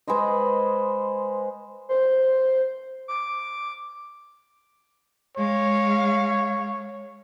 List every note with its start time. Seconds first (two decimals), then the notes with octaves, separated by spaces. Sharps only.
0.07 G#3 B4 C5 D#5
1.89 C5
3.08 D6
5.37 G#3 C#5 F5